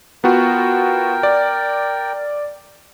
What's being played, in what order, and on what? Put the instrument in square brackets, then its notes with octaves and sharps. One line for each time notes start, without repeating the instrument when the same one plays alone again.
[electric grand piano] B3 F4 F#4 [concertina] A#4 G5
[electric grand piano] D5